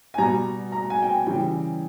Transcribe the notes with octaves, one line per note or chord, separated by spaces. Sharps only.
G#5
B2 G3 A#5
A#5
G#5
G5
G#5
C#3 E3 G3 G5